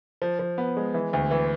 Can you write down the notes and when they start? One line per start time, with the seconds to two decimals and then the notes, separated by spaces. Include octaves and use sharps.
0.22 F3
0.39 F3
0.58 B3
0.77 G#3
0.94 E3
1.13 D2
1.31 E3